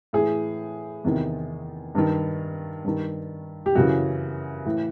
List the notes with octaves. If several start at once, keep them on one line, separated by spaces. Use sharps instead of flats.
A2 E3 G#4
E2 C3 D#3
G2 D#3
G2 D#3
G4
F#2 C#3 E3 F#4
A2 E3